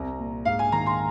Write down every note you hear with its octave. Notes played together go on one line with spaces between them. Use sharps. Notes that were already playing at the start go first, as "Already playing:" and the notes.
Already playing: C2 A#5
A#2
G#2 F5
G#5
D#3 A#5
C6